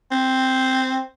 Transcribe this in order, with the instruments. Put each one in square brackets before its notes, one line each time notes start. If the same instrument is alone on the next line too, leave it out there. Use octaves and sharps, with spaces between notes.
[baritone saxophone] C4